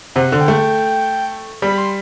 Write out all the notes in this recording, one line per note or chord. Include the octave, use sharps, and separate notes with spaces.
C3 F#5
D3
G5
A3
G3 B5
C6